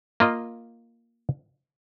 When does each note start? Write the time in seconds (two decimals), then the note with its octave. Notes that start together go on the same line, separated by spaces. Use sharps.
0.20 A#3 F4 D#5